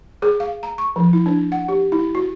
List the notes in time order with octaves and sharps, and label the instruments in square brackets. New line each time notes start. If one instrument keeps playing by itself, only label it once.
[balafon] G#4
F5
A#5
C#6
F3
E4
D4
F#5
G4
E4
F#4